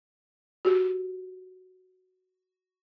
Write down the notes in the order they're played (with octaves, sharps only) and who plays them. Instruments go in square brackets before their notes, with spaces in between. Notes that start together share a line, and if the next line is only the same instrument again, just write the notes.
[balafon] F#4 G4